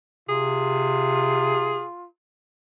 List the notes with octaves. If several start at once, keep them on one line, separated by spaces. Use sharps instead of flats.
C3 F4 G#4